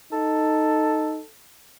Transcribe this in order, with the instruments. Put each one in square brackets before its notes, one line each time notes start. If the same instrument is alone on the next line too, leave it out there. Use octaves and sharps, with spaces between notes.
[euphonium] D#4 [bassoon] A4